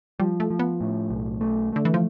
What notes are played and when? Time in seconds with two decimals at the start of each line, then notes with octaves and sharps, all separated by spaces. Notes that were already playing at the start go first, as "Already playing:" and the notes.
0.20 F3 G3
0.40 A3
0.50 F3
0.59 B3
0.81 A2
1.10 B1
1.41 A3
1.72 D3 A3
1.85 E3
1.94 F3